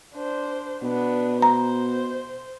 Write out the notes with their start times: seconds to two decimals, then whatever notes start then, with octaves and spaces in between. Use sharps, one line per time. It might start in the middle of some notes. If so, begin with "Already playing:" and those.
0.14 D4 C5
0.82 B2 B3 D4
1.42 C5 A#5